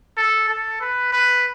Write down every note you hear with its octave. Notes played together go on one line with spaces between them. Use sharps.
A4
A4
B4
B4